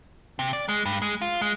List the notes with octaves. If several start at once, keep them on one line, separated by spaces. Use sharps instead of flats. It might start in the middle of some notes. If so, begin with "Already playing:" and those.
C3
D5
G#3
G2
G#3
F4
G#3